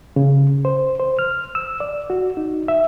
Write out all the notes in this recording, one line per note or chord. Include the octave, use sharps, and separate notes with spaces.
C#3
C5
C5
F6
E6
D5
F#4
D#4
E5